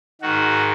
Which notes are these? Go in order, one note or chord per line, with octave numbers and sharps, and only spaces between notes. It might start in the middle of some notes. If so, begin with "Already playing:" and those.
G#2 D#3 F#4